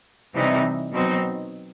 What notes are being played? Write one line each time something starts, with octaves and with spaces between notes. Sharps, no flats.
C3 E3 G3 D#4
B2 F#3 C4 D#4